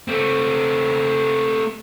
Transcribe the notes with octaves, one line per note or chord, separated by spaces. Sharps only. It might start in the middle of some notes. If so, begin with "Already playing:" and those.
A3 C4